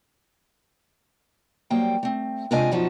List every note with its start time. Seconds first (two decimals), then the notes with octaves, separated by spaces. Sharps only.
1.70 F#3 G3 A#3 C5 G5
2.03 A3 C4
2.51 C3 G#3 D4 F4 D#5 G#5
2.71 F#2 B2 F3 D#4 F#4